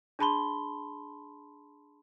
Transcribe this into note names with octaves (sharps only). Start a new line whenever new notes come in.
D4 G#4 A5 B5 C6 G7